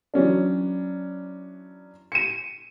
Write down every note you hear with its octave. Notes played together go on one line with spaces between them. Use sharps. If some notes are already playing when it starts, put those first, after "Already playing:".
E3 F#3 C#4 D4
C#7 D#7